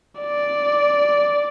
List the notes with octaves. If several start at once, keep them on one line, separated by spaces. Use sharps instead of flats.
D5